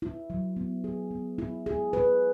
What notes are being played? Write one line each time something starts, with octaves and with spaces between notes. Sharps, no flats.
E4
F#3
B3
G#4
B3
E4
G#4
B4